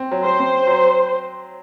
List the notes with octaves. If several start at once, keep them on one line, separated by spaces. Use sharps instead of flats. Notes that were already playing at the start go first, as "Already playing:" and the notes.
Already playing: C4
F#3
C5
C4
F#3